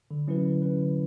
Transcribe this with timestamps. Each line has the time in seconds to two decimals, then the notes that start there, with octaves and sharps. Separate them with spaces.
0.11 D3
0.28 F#3 C#4 E4 B4
0.45 D3
0.62 F#3 C#4 E4 B4
0.80 D3